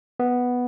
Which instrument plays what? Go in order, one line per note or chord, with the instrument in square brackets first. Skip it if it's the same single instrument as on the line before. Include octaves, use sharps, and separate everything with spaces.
[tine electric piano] B3